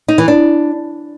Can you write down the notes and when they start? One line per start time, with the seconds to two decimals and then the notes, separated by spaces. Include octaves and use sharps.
0.08 D#4
0.18 E3
0.28 D4